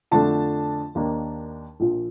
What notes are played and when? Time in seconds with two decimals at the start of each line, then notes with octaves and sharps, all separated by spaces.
0.11 F2 D3 F3 A3 D4 A5
0.95 D#2 D#3 A#3 D4
1.80 A#1 A#2 F3